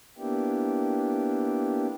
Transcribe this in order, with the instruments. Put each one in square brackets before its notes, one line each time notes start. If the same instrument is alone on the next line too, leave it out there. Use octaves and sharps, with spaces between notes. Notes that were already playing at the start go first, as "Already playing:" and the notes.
[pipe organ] A#3 B3 D4 E4 G4